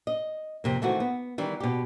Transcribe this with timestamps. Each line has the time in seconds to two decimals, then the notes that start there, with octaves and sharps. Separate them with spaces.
0.07 D#5
0.64 F2 C3 A#3
0.82 D#3 E3 A3 C4 F#4
1.00 B3
1.38 D#3 E3 G3
1.60 B2 G4